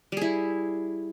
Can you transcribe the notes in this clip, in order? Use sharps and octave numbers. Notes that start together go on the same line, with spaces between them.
G3 E4 G#4